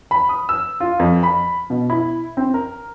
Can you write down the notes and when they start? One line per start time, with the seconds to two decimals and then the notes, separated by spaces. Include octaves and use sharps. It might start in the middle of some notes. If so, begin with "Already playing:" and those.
0.11 B5
0.29 D#6
0.49 E6
0.80 F4
0.99 F2
1.23 B5
1.70 B2
1.90 E4
2.37 C4
2.54 A#4